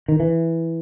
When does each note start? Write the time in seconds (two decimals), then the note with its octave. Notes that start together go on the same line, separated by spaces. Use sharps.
0.08 D#3
0.20 E3